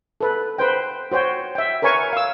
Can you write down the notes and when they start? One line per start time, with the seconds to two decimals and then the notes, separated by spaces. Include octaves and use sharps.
0.21 A4 B4
0.58 B4 C5 G5
1.11 F#4 C5 C#5 G5
1.55 E5 G5
1.82 A#4 B4 C#5 G#5 C#6
2.13 F5 E6